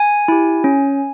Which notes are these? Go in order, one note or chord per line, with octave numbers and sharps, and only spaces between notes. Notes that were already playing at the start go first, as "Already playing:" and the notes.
Already playing: G#5
E4 G4
C#4